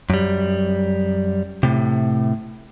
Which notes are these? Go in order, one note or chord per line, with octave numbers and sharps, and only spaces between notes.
F#2 G3
A2 C3